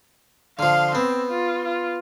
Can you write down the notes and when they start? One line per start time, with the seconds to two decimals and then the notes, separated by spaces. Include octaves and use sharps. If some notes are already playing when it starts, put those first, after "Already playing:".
0.59 D3 F3 F5 C6
0.95 B3 C4
1.30 F4
1.64 F4